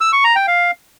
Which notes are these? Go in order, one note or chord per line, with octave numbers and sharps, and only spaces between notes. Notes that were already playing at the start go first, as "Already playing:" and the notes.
E6
C#6
A#5
G5
F5